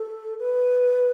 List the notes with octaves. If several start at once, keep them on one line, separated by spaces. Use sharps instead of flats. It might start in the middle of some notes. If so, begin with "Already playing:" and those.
Already playing: A4
B4